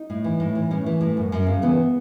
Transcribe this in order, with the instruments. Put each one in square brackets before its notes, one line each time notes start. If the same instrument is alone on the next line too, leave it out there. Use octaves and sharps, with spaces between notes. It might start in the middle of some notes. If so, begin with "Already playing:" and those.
Already playing: [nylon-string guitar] D#4
A2
E3
A2
E3
A2 C#4
E3
A2
F#2
F#2
C#3
E3 B3